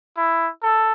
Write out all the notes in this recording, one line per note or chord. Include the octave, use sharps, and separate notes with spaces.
E4
A4